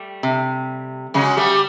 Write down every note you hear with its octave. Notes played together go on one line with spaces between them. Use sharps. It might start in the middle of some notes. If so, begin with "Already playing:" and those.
Already playing: G3 A3
C3
C#3 F#3 G#3
G3 A3